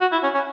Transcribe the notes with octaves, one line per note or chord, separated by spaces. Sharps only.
F#4
E4
C#4
C#4